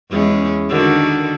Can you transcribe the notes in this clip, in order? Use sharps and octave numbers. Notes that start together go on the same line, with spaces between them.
E2 G#3 C#4
D3 D#3 F#4